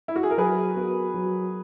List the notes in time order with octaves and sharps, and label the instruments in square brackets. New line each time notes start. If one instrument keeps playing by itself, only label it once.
[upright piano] E4
F#4
G#4
A#4
[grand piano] F#3 [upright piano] G#4 B4
[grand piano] B3 F#4 A#4
F#3